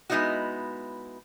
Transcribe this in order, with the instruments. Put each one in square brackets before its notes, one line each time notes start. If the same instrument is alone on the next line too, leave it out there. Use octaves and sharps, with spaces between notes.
[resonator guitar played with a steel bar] G#3 B3 C4 D#4 E4 F#4